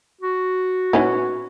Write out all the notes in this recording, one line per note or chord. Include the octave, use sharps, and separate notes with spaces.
F#4
A#2 B3 C#4 D#4 E4